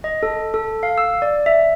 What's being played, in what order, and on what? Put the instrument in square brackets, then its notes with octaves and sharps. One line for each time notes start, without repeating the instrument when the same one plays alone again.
[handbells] D#5
A4
A4
F5
E6
D5
E5